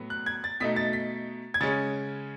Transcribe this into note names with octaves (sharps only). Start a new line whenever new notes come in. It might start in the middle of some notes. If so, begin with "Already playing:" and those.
Already playing: A2 F#3 B3
F#6
G#6
A6
B2 A3 D#4 B6
A6
B6
G#6
C#3 G#3 C#4 A6